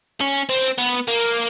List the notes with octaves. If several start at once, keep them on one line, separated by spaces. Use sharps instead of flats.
C#4
C4
B3
A#3